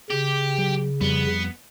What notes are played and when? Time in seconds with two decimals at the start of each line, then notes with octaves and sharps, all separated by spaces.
0.10 C#3 G4
0.58 F#3
1.01 F2 G3 B3